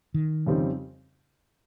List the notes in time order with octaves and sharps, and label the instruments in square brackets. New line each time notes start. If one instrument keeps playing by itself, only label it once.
[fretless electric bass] D#3
[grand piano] F2 C#3 G3 C4 D#4